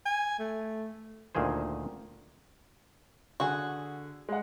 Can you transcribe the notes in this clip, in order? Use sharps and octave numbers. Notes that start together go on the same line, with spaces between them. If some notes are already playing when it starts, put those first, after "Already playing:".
G#5
A3
D2 A#2 D#3 G#4 C5
D3 F#4 G#4
G#3 F#5